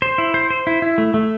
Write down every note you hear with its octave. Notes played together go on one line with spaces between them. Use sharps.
C5
E4
C5
C5
E4
E4
A3
A3